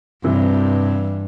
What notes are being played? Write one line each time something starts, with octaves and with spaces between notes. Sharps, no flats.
G2 C3 E3